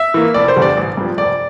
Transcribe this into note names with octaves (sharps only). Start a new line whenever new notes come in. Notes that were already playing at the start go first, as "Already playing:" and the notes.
Already playing: E5
E3 A#3
F1 D5
C5
E2 D3 G3
D5
A1
G2 F3
F1 D5